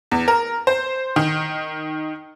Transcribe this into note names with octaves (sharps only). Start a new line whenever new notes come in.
E2
A#4
C5
D#3